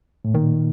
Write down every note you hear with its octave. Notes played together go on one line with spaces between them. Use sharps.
A2
A#2 D#3